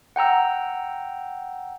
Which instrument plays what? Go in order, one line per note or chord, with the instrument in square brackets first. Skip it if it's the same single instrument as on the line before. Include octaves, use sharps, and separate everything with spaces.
[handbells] F#5 G5 A#5 E6